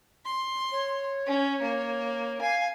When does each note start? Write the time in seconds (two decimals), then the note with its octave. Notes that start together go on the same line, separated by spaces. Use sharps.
0.25 C6
0.72 C#5
1.26 C#4
1.62 A#3
2.41 F5 G#5